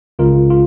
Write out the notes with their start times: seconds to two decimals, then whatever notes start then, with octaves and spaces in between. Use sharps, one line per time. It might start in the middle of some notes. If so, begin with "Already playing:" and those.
0.19 C#2 C#3 G#3 F4 A#4
0.50 F4